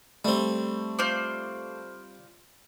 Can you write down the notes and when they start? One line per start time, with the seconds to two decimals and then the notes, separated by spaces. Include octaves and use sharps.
0.25 G3 A3 C4
0.99 F4 C5 D5